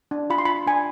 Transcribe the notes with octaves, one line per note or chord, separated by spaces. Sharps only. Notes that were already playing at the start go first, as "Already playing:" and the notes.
D4
F4 B5
C6
F4 B5
D4 G#5